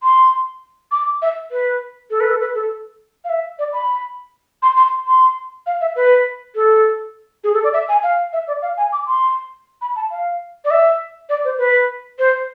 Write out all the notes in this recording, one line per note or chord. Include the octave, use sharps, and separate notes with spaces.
C6
D6
E5
B4
A4
B4
A4
B4
A4
F5
E5
D5
B5
C6
C6
C6
F5
E5
B4
A4
G#4
A4
D5
E5
G#5
F5
E5
D5
F5
G#5
D6
C6
B5
A5
F5
D5
E5
D5
C5
B4
C5